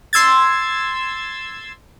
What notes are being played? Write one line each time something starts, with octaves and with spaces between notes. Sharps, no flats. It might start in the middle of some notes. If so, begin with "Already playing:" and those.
C6 E6 G#6 A6